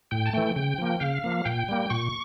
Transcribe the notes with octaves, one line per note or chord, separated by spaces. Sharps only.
A2 G5
A5
E3 A3 G5
C#3 G5
F3 A#3
C#3 F5
F3 A#3
A#2 G5
G3 A#3
A#2 C#6